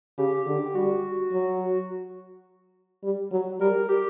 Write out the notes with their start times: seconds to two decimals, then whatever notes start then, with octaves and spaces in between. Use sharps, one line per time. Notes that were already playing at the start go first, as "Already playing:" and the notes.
0.18 C#3 G4
0.46 D3 G4
0.65 G4
0.75 G3 F#4
1.32 F#3
3.03 G3
3.32 F#3
3.60 G3 A#4
3.89 G4